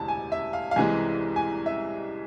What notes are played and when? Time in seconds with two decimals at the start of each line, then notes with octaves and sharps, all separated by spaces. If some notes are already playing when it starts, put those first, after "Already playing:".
Already playing: E1 D2 C3 E3 A5
0.08 G#5
0.32 E5
0.53 F5
0.71 F5
0.76 C2 C3 E3 G#3 G#5
1.36 G#5
1.66 E5